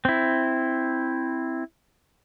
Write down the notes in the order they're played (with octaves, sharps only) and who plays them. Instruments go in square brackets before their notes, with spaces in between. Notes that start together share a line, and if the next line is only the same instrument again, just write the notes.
[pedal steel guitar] C4 E4